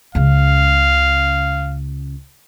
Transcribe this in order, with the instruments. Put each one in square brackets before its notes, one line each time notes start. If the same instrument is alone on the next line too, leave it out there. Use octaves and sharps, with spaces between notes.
[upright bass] C#2 C#3 [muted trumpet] F5